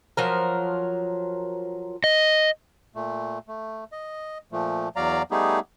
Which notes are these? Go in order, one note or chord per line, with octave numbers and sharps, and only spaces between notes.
F3 F#3 A#4
D#5
A#2 A3
A3
D#5
A#2 F3 A3
E2 F#3 D5 F5 A#5
G3 A3 B3 D#4 G4 G#4